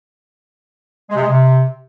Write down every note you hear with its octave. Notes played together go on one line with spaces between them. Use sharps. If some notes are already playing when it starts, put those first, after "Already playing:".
G#3
C3
G#3
C3